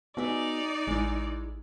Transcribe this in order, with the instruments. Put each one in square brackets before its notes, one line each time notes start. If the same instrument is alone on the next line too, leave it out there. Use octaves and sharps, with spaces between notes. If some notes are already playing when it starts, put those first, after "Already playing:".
[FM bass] B3 [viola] D#4 D5 [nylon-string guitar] F#4 G#4 E5
[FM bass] A1 [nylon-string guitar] G#3 E4